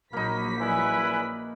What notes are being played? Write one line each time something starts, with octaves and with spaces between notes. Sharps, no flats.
A#1 F#3 A#3 D#4 B5 B6
C#2 E4 B4 D5 G#5 F#6